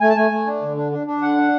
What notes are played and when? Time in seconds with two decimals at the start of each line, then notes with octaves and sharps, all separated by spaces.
0.01 A3 G#5
0.09 A5
0.16 A3 G#5
0.31 A3
0.46 D4
0.62 D3
0.77 D4
0.92 D4
1.07 D4
1.22 D3 F#5
1.37 D4